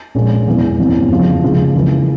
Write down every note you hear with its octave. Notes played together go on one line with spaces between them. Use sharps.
A#1 A#2 G#3 C#4
E1 E2 E3
G1 F2 C3 E3
F1 F2 C#3 F3
C#2 C#3 F3 G#3
C#2 C#3 E3 A#3 E4